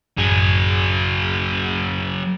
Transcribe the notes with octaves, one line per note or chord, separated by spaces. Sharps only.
A1 F#2 F#3 G#4